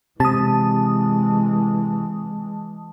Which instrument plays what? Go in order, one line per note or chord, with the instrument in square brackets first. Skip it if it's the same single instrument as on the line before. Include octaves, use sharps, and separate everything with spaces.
[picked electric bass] C3 [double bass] E3 G#3 [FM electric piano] A5 D#6